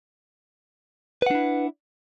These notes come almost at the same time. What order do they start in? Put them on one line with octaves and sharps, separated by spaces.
B4 F#5 D4 E4